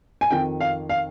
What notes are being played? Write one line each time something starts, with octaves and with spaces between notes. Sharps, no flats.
G#5
F2 D#3 G5
F5
F5